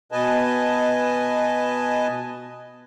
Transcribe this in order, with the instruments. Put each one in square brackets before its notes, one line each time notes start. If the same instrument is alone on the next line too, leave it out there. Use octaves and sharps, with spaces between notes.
[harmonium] B2 B4 D#5 G#5 A5